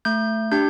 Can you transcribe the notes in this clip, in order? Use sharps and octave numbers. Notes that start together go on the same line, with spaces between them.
A3 G6
D4 G4 G6